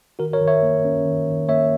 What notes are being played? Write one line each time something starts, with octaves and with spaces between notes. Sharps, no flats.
D#3 F#4 A#4
A#4 C#5
D#3
C#5 E5
A#3
C#4
D#3
D#3
A#3 C#5 E5